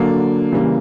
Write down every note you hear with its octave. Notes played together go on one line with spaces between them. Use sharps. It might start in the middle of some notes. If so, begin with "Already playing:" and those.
Already playing: D3 F#3 A#3 D4
C#3 E3 G3 A#3